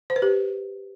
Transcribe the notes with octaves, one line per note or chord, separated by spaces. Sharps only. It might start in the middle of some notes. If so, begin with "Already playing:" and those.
C5
B4
G4